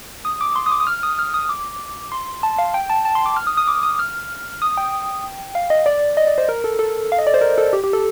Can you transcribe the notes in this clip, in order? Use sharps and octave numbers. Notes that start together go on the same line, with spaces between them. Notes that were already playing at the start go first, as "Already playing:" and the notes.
D#6
D6
C6
D#6
D6
D#6
F6
D#6
F6
D#6
D6
C6
A5
F5
G5
A5
A5
C6
D6
F6
D#6
D#6
D6
D#6
F6
D#6
G5
F5
D#5
D5
D#5
D5
C5
A#4
A4
A4
F5
D#5
D5
C5
A#4
A4
G4
G4
A4